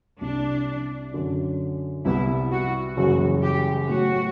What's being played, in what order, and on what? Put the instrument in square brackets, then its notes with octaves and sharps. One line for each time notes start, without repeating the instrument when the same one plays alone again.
[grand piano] C2 C3 G3 [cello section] D4
[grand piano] F#2 D3 F#3
[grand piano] C2 C3 G3 B3 [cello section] E4
[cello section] F#4
[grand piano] F#1 F#2 E3 G3 [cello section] F#4
[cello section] G4
[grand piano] A2 F#3 B3 [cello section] F#4